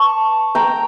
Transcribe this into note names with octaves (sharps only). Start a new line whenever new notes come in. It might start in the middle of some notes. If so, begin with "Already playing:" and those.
Already playing: A5 C#6
G5 A#5